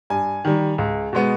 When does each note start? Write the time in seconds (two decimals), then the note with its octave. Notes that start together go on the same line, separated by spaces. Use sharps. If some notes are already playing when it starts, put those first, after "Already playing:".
0.10 G2 G#5
0.45 D#3 G3
0.78 C#2
1.13 B2 G#3 B3